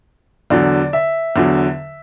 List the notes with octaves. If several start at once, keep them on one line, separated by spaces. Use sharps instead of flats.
E2 D3 F#3 D5
E5
E2 D3 F#3